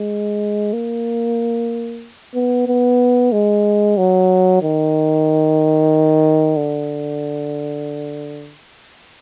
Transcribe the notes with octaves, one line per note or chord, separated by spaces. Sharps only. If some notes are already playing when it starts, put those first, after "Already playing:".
Already playing: G#3
A#3
B3
B3
G#3
F#3
D#3
D3